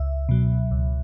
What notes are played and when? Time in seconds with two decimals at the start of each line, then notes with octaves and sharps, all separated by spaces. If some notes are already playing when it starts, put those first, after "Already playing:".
Already playing: C#2 E5
0.29 B2 F#3
0.71 C#2